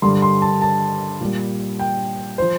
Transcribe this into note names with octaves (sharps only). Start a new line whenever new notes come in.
G2 D3 G3 C6
C6
A5
A5
A#2 G3
G5
F3 C5